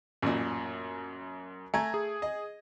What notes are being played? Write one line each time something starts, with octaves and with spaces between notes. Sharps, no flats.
A1 F#2 A#2
A3 G#5 A#5 G#6
G#4
D#5